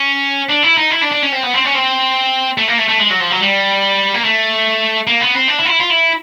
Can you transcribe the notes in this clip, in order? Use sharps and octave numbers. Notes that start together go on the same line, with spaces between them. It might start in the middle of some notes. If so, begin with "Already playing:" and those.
Already playing: C#4
D4
E4
D#4
E4
D4
D4
C#4
C4
B3
C4
C#4
C4
A3
A#3
A3
A3
G#3
F#3
F3
F#3
G3
A#3
A3
A#3
B3
C4
D4
E4
F4
E4
F4
E4